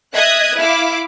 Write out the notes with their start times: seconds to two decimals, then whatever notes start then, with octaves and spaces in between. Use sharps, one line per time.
0.13 D#5 E5 D#6 F#6 G#6
0.55 E4 F5 D6